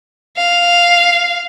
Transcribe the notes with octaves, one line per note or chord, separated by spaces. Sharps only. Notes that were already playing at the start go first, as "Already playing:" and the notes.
F5